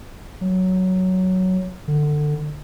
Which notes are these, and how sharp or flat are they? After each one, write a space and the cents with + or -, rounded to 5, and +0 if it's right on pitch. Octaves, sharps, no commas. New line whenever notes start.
F#3 +5
D3 +20